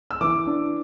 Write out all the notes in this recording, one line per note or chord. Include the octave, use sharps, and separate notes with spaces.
E6
E3 D6
D4